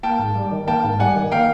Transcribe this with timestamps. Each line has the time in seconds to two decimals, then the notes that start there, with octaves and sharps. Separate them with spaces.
0.03 A#3 G5 A5
0.19 G#2
0.36 G3
0.51 D#3
0.68 A#3 G5 A5
0.84 G#2
1.00 G3 F#5 G#5
1.16 D#3
1.32 A#3 F5 G5